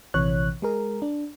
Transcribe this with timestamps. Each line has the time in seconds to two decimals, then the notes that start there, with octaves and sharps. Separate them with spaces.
0.14 A#1 C3 E3 C#5 F#6
0.62 G#3 G#4 A#4
1.02 D4